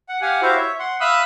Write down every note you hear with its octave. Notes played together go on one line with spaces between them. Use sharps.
F#5
G4 F5 F#5 G#5
E4 F#4 G4 C5 E5 F5
C#5 E5
F#5 C6
E5 F5 B5 D#6 E6 F#6